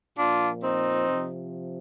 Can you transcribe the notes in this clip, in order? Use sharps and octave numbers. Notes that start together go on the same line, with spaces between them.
A#2 F3 D4 F4
C4 D#4
C3 F3